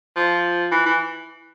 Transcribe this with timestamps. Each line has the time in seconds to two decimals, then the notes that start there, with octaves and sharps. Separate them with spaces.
0.17 F3
0.71 E3
0.86 E3